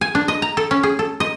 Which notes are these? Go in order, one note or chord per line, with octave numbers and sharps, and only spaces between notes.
G#5
D4
D#5
A#5
A4
C#4
G#4
A4
D#5